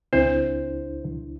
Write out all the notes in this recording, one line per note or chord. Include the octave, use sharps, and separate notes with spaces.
C#2 C4 D4 E4 C5